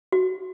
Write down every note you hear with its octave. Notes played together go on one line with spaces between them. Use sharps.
F#4